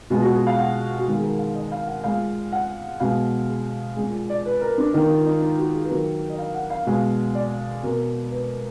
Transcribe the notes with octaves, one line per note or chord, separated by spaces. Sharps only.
B2 G#3 F4
F#4
G#4
F5
F#5
F#4
D#3 G#3 G#4
G#4
A#4
F5
D#5
F5
F#5
A#2 G#3 F5
F#5
B2 G#3 F5
G#4
A#2 G#3 G#4
D5
B4
A#4
D4
D#3 A#3 D#4
F4
D#4
F4
F#4
G#4
B4
D#3 F#3 A#3 A#4
D#5
F5
F#5
F5
B2 G#3 F5
D5
B2 A#3 A#4
B4